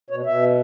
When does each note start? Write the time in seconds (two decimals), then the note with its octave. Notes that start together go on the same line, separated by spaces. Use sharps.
0.10 B2 C#5
0.26 B2 E5